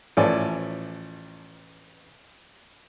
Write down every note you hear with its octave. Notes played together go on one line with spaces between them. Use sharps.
A1 F3 A4 C#5 D5 G#5